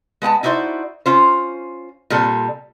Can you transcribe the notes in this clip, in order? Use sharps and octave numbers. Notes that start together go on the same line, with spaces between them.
G#3 B3 F#5 A5
D#4 E4 F#4 C5 D5
C#4 F4 C5
A#2 G3 C4 A4